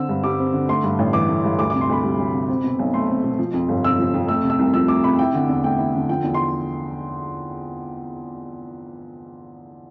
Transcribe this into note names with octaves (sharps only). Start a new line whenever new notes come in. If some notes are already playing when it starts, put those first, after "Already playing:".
Already playing: D3 C4 E6
G2
G3 D6
C4
D3
A3 C6
G2
A1
E3 D6
A3
G2
D2 D6
C3 D6
C6
D2 B5
G3
D2
C3
C4
B2
B1
A3 C6
C4
B2
F3
F2
G1
C3 E6
F3
F2
A3 E6
C3
E6
C2
F3 E6
A3 D6
C3 B5
E4 G5
D3
E2
A3 G5
E4
D3
F3 G5
E2
C6